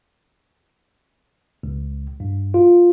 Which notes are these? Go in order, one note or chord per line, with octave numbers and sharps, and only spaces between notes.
C#2
G2
F4